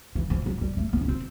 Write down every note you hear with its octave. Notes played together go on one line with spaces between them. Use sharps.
E3
F3
F#3
G3
A3
B3
C#4
C4